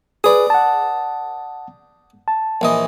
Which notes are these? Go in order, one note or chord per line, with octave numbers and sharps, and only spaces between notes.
G#4 B4 D5 D#6
F#5 A5
A5
A#1 E3 D#5